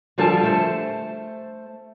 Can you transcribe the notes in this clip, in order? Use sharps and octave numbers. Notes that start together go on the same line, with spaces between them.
D3 F3 G3 A4 G#5 A5
A3 C5